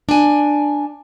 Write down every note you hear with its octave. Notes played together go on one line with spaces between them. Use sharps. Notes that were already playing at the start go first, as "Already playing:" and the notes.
D4 G#5